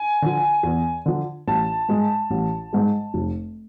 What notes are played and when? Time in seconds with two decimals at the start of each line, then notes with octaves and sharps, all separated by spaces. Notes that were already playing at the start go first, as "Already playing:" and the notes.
Already playing: G#5
0.22 D3 F3
0.63 E2
1.06 D3 F3
1.47 A1 A5
1.89 G#2 G#3
2.30 A1
2.73 G#2 G#3
3.14 F1